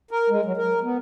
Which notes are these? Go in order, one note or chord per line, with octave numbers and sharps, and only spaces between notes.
A#4
G#3
F#3
A#4
B3